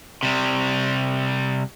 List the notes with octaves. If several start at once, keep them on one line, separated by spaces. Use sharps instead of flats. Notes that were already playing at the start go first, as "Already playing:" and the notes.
C3 G3